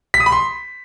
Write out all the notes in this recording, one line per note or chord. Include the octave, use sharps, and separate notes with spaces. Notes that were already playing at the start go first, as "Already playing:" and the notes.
B6
D#6
B5
C6